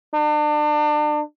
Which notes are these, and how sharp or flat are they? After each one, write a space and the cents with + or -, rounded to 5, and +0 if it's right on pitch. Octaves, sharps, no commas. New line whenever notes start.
D4 +35